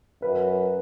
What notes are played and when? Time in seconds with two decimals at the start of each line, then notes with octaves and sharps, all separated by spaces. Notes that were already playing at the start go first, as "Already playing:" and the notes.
0.22 F#2 B4